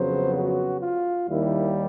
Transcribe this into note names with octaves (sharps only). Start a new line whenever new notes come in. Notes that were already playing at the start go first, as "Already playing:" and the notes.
Already playing: F2 C#3 F#3 B3 C5
F#4
F4
D#2 D#3 G3 A#3 E4